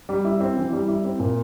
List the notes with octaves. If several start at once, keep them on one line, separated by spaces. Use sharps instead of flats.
G3
E4
C4
E3
G3
E4
C4
A#2